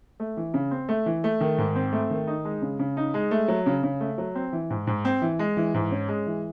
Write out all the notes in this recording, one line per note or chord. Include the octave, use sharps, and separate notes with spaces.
A3
E3
C#3
C4
A3
E3
A3
D#3
G#2
C4
A3
D#3
D#4
G#3
C#3
C#3
D#4
G#3
A3
F#3
C#3
C#3
A3
F#3
C4
E3
G#2
G#2
C4
E3
G#3
E3
G#2
C#4
G#3
E3